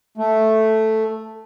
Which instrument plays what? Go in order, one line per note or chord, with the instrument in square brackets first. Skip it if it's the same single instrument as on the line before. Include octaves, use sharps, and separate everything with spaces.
[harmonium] A3